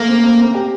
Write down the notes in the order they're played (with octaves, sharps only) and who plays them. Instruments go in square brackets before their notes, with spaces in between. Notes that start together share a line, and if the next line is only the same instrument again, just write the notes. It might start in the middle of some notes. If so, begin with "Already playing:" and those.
Already playing: [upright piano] A3 [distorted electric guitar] A#3
[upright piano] C4
C4
C4
G4